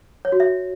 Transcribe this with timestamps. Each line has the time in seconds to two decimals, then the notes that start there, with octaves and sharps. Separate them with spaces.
0.25 C#5
0.32 F#4
0.40 E5